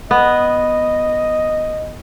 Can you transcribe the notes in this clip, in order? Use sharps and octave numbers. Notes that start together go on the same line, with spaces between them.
B3 D#5